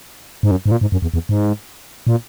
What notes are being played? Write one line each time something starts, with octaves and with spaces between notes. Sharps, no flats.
G#2
F#2
G#2
A#2
G#2
F#2
E2
E2
G#2
A#2